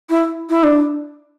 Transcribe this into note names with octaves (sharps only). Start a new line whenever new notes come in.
E4
E4
D4